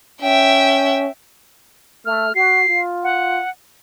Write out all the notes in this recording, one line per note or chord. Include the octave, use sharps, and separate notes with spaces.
C#4 E5 G5
A3 F6
F#4 C7
F4
F#5